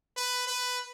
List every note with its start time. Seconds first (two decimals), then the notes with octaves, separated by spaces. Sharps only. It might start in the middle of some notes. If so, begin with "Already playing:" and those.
0.16 B4
0.47 B4